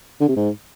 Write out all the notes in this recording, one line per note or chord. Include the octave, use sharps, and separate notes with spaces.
D3
C3
G#2